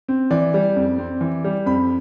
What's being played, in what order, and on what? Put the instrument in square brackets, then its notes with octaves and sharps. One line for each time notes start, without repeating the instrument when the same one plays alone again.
[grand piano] C4
E3 D5
G3
F2
C4
E3
G3
F2 B5